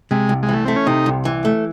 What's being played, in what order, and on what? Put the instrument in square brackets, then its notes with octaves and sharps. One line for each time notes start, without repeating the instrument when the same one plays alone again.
[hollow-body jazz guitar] C3 [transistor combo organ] G#3
[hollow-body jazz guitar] C2
[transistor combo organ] G#3
[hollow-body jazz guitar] E3 [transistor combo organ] A3
[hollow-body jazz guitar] A3 [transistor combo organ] C4
[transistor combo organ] C#4
[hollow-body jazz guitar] C3 [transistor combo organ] D#4
[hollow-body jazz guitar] C2
E3
A3